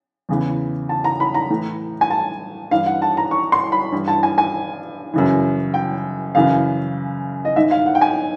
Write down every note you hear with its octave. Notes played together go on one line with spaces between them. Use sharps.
E2 C#3 E3
A5
A#5
B5
A#5
A2 E3
G#5
A5
G2 E3 F5
F#5
A5
A#5
C#6
C6
B5
G2 E3
A5
G#5
G#5
F#2 C#3 E3
G5
F#2 C#3 E3 F5
D#5
G#2 D#3 E5
F5
F#5
G5
G#5